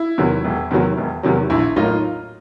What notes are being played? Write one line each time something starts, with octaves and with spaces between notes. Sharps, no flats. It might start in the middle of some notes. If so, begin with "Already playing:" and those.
Already playing: E4
E2 C3 D#3 F#3
E1
E2 C3 D#3 F#3
E1
E2 C3 D#3 F#3
A#1 E4
A2 F#3 A#3 D#4 F4